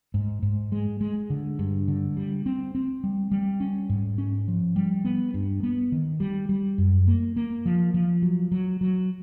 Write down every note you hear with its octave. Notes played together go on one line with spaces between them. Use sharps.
G#2
G#2
G#3
G#3
D3
G2
D3
G3
C4
C4
G3
G3
C#4
G#2
C#4
F3
G3
B3
G2
B3
D#3
G3
G3
F#2
A#3
A#3
F3
F3
F#3
F#3
F#3